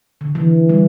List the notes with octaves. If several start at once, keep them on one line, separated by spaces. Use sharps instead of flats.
D3
E3
G3